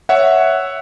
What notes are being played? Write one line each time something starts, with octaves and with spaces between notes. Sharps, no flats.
C#5 E5 F#5